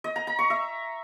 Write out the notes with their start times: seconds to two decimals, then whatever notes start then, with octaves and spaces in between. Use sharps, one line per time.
0.04 D#5
0.16 A#5
0.27 A#5
0.39 C#6
0.50 E5